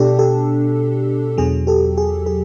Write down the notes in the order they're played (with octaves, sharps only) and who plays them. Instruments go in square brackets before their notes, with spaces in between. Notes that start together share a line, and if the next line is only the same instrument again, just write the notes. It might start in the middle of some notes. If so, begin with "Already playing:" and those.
Already playing: [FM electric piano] B2 D4 G4 A4
G4 A4
E2 B2 F#3 G#4
G4 A4
G#4
G#4